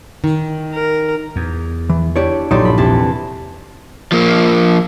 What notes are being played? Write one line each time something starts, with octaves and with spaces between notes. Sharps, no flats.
D#3
A#4
E2
E3
D4 E4 G4 C#5 D5
A#1 G2 D3 F#3 D#4 G4 A4 C6
B5
E2 C3 A5
F3 A#3